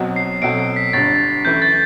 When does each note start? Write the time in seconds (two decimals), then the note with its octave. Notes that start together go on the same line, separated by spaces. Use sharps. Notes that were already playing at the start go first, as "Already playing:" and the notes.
Already playing: B1 B2 F#3 C4 F#4
0.16 C7
0.42 B2 F#3 C4 F#4 A4 D7
0.59 C7
0.76 B6
0.93 G1 G2 D3 A6
1.45 F#2 E3 A3 E4 G6
1.62 A6